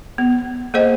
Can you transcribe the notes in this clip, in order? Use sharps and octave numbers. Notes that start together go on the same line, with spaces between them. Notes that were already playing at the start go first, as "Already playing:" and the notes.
B3
A#3 G#4 C5 D#5 G5